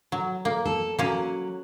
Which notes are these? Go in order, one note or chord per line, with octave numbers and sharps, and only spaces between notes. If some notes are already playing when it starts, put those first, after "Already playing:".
F#3
A#3
A4
F#3 A#3 C#4